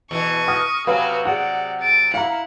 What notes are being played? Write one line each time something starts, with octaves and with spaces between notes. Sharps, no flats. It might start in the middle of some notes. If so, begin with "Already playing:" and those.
E2 B2 E3 C#6 D#7
D#6 F6 A#6
C3 F#3 F#4 B4 F5 F#5 G#5
G#4 D5 F#5
A6 D7
E4 F5 F#5 A#5